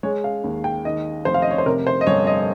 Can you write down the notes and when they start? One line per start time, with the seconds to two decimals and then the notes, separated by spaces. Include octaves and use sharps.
0.03 G#3 C#5
0.24 F5
0.44 D#2
0.64 G5
0.85 D#3 D#5
1.25 F1 C5
1.34 F5
1.42 D#5
1.51 C#5
1.58 C5
1.66 C3 A#4
1.87 C5
2.01 D#5
2.07 G1 C#5
2.27 D#5